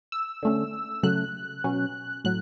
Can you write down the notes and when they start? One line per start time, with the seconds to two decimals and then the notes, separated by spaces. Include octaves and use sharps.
0.12 E6
0.43 D3 A3 C#4
1.03 C#3 F#3 A3 F#6
1.64 B2 F#3 C#4
2.24 A2 F#3 F#6